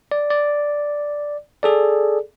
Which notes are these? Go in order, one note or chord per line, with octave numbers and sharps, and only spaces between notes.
D5
D5
G#4 A4 D5